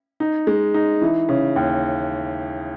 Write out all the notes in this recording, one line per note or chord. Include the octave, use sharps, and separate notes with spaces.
D#4
G#3
D#4
E3
C#3
D#2